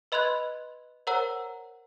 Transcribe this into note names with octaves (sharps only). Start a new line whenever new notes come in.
B4 D#5 B5 C6 F#6 G#6
A#4 C5 C#5 F#5 A#5 E6